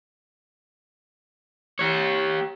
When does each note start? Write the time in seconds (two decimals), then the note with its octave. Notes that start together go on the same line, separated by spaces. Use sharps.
1.79 G4 C#5